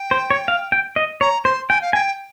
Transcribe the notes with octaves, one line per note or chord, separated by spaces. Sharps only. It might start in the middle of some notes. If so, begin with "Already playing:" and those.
Already playing: G5
C5
C#5
F5
G5
D#5
C#5 A#5
C5 C6
G5 G#5
F5
G5 G#5